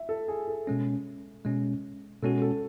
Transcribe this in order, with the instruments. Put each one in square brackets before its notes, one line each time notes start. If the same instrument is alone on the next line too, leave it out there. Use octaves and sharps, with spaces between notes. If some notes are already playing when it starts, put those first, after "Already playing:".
Already playing: [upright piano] E5
A4
G#4
A4
[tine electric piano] B2 G#3 C#4
B2 G#3 C#4
[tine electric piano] B2 G#3 C#4 F#4 [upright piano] A4
[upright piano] A4